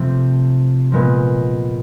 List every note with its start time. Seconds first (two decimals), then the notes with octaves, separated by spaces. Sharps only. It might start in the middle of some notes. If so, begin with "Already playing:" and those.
Already playing: C3 F3 A3 C4
0.92 A#2 F3 G#3 B3